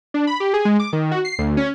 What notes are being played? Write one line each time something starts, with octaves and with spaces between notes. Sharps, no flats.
D4
B5
G4
G#4
G#3
D6
D#3
F#4
C7
D2
C#4